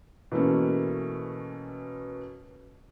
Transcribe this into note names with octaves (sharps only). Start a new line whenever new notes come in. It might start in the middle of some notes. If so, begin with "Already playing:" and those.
B2 E3 A3 A#3 C#4